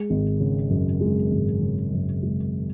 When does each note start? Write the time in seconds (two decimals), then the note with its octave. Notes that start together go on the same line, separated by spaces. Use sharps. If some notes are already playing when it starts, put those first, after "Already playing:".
Already playing: G#3
0.10 G#1
0.40 C#3
0.70 F#2
1.01 G#3
1.31 G#1
1.61 C#3
1.92 F#2
2.23 G#3